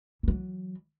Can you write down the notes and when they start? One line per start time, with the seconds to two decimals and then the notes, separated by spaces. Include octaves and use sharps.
0.23 E3 F#3